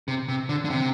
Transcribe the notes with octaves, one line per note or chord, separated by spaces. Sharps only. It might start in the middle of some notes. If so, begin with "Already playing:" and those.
C3
C3
D3
D3
C3